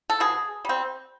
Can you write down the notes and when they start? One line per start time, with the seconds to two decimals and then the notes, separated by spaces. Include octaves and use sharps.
0.10 A4
0.20 B2 G#4
0.65 G3 C4